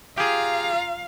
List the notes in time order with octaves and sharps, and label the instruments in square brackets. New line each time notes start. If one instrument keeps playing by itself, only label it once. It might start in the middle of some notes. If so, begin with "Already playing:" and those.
[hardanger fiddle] F4 A#5 [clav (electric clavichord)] G4 G#4 [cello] F5